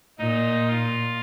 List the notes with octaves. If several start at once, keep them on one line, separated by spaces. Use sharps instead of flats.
A#2 D#4
F4